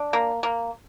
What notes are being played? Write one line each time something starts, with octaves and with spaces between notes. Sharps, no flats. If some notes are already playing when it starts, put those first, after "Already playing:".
Already playing: D4
A#3
A#3